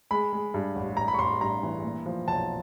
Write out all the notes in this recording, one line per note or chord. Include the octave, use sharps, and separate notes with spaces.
G#3 B5
G#3
G2
A1
G2 A#5
B5
C#6
A1 C6
G2 A#5
E3
A#2
F3
B1 A5